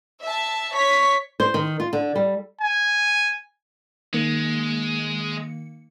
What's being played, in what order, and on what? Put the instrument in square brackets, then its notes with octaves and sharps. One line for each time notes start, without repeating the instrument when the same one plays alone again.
[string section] E5 A5
C#5 B6
[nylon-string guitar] C5
D#3
F4
D3
G3
[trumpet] G#5
[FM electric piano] D#3 A#3 C#7 [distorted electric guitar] G#3